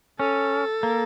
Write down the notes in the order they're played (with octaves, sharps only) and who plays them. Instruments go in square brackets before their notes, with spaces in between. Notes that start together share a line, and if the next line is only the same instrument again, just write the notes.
[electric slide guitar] C#4 [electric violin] A4
[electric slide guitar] A#3